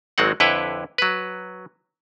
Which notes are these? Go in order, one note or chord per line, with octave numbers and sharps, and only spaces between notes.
G#1 F#3 G#3 C4 F#5
F2 D3 E4 B4 C#5 G5
F#3 B4